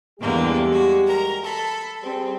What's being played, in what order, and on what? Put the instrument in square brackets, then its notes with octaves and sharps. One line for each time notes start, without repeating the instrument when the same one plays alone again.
[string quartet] E2 D3 A#3 [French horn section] G3 G#3 G4
[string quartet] F#4
A#4 A#5
A4 B5
[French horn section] G3 G#4 [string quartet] C4